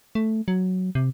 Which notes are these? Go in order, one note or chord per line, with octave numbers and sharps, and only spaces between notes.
A3
F#3
C3